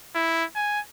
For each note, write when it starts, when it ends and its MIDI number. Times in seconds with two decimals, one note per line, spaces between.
0.15 0.45 64
0.55 0.80 80